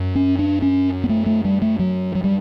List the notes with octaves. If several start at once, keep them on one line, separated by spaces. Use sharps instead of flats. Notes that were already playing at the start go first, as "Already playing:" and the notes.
Already playing: F#2
C#4
D4
C#4
B3
A3
A3
G3
A3
F#3
F#3
G3